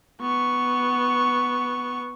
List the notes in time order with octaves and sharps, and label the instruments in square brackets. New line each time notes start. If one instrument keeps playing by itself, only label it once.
[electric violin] B3 C#6